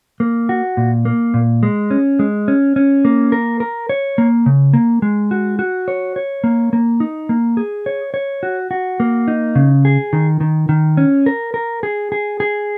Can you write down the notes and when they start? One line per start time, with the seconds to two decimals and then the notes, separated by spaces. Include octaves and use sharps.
0.20 A#3
0.49 F#4
0.77 A#2
1.05 A#3
1.34 A#2
1.63 G#3
1.91 C#4
2.19 G#3
2.48 C#4
2.76 C#4
3.05 A#3
3.32 A#4
3.60 A#4
3.89 C#5
4.18 A#3
4.46 C#3
4.74 A#3
5.02 G#3
5.31 F#4
5.59 F#4
5.88 C#5
6.16 C#5
6.44 A#3
6.73 A#3
7.00 D#4
7.29 A#3
7.57 G#4
7.86 C#5
8.14 C#5
8.43 F#4
8.71 F#4
9.00 A#3
9.28 D#4
9.55 C#3
9.85 G#4
10.13 D#3
10.41 D#3
10.69 D#3
10.97 C#4
11.26 A#4
11.54 A#4
11.83 G#4
12.12 G#4
12.40 G#4